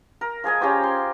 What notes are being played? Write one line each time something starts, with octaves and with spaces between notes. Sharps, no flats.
A#4
F3 G#4 D#5 G#5
C#4 F4 G4 C5
C6